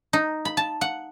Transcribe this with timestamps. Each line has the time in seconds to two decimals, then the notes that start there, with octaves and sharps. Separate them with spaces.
0.13 D#4
0.45 B5
0.57 A5
0.81 F#5